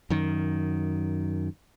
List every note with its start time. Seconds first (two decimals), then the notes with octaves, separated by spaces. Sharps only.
0.10 F#2 D#3